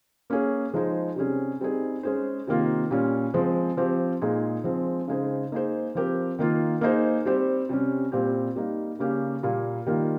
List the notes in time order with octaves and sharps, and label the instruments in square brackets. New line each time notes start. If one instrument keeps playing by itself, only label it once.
[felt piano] A#3 C#4 G#4 C#5
F3 G#3 D#4 G#4 C5
C3 G3 C#4 G#4
G3 C4 D#4 G#4
G#3 C#4 G#4 C5
C3 D#3 A#3 F4
A#2 G3 C#4
F3 G#3 C4
F3 C4 G4
A#2 G#3 D#4 G#4
F3 G#3 C4
C#3 G#3 D#4 G#4 C5
A#3 D#4 G#4 C5
F3 C4 G4 A#4
D#3 A#3 F4
A#3 D#4 G#4 C5
G3 C4 G4 C5
C3 G3 C#4
A#2 G3 C4 G4
G3 A#3 D#4
C#3 G3 A#3 C#4 G4
A#2 G3 A#3
D#3 G3 A#3 F4